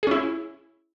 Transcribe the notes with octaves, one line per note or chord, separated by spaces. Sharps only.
C#4 E4 G#4